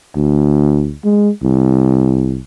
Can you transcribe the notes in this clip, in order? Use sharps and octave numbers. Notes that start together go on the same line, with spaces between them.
D2
G#3
C2